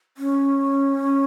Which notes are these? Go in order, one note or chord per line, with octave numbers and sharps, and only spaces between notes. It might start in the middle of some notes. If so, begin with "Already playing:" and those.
C#4